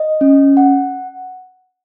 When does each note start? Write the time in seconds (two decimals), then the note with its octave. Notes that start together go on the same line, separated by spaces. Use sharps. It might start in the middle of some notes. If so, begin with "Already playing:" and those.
Already playing: D#5
0.21 C#4
0.57 F#5